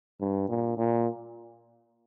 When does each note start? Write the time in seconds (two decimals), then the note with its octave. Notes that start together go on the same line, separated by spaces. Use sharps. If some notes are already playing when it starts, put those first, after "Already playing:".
0.21 G2
0.49 A#2
0.78 A#2